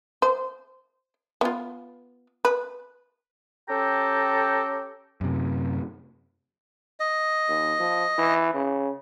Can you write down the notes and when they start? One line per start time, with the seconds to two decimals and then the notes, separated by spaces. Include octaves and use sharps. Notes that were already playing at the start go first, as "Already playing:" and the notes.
0.22 C5
1.41 B3 F4
2.45 B4
3.69 C#4 G4 A4 G5 A#5
5.21 F#2 C3
7.00 D#5
7.48 D#2
7.79 F3
8.18 E3
8.54 C#3